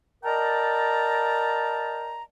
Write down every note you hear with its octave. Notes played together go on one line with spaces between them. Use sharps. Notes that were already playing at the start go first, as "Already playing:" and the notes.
A#4 D5 D#5 G5 A5 A#5